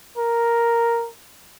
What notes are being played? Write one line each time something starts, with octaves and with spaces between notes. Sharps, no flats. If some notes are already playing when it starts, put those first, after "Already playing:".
A#4